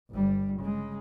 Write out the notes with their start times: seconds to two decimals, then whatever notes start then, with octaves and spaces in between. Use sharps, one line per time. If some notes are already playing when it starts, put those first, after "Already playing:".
0.10 G1 G3
0.60 C#3 G#3